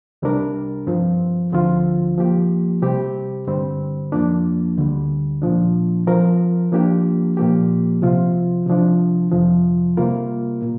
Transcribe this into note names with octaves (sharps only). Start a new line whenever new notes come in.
C2 C3 G3 D4 A#4
G2 F3 C4 F4
D2 D3 F3 C4 F4
F3 A#3 G4
C3 G3 C4 G4
G2 D3 G3 C4
F2 F3 A#3 D4
D2 D3 G3
A#2 F3 D4
F3 C4 A#4
F3 A#3 D4 G4
A#2 F3 A#3 G4
C2 C3 F3 C4 F4
C3 F3 D4
F2 C3 F3
C3 G3 A#3 F4 A#4
A#2